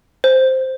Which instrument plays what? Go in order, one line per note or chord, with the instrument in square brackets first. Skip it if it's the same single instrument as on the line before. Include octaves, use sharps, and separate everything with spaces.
[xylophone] C5